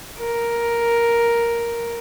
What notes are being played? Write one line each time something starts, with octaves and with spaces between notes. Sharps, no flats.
A#4